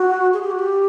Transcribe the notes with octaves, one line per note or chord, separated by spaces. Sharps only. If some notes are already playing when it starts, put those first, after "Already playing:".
Already playing: F#4
G#4
G4
F#4
G4